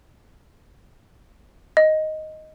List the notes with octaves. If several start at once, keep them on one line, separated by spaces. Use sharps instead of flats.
D#5